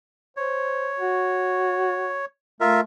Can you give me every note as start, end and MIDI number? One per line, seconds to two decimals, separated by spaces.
0.37 0.89 72
0.37 2.25 73
0.99 2.19 66
2.61 2.83 57
2.61 2.81 65
2.61 2.81 70
2.61 2.81 76